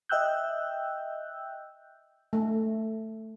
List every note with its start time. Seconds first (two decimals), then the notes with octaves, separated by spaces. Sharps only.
0.09 D#5 E5 G5 E6 F#6 G6
2.33 A3